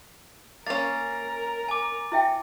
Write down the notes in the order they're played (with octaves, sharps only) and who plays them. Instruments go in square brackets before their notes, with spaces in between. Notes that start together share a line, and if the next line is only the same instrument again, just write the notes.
[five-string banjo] A#3 C#4 [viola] A#4 [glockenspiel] A6
[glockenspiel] G#5 D6
[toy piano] E4 E5 G5